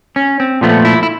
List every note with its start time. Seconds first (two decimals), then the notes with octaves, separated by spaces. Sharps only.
0.16 C#4
0.40 C4
0.61 A#2 F3 A3 B3
0.85 E4
1.03 E4